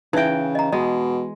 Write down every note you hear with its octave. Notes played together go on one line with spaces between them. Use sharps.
C#3 E3 D#4 E5 G5
D#5 A#5
B2 G#3 D#5